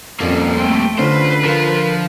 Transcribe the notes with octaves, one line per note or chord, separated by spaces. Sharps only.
F2 G3 A#3 C#4 A4
A3 C4 G5 C6
D3 C#4 F4 B4 C5
F3 F4 A#4